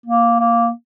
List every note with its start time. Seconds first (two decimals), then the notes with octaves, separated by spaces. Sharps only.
0.06 A#3
0.40 A#3